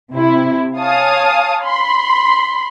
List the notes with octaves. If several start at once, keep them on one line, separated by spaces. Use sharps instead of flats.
C3 E4
C#5 F5 G#5 A5 D#6
B5 C6